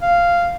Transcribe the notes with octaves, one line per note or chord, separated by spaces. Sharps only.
F5